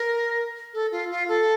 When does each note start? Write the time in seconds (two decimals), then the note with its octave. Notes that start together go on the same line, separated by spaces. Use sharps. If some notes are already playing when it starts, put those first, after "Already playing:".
Already playing: A#4
0.74 A4
0.92 F4
1.11 F4
1.28 A4